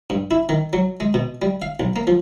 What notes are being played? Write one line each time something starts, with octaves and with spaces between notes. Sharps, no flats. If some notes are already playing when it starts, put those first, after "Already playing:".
G2
E4
D#3
F#3
G#3
B2
G3
F5
B1
A#3
F3